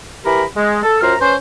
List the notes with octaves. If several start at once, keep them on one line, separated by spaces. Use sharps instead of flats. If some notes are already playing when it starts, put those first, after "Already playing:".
E3 G4 A#4 B5
G#3
A4
F#2 F4 C5 A#5 F6
C#4 B4 C5